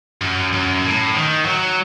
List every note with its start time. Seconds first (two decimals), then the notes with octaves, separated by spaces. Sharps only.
0.21 F#2
0.52 F#2
0.84 A2
1.14 D#3
1.45 F#3